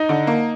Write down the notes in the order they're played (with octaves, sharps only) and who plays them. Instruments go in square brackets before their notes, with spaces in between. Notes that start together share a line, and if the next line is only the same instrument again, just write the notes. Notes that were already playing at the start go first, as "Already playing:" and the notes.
Already playing: [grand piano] D#4 D#5
[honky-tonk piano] D3
A#3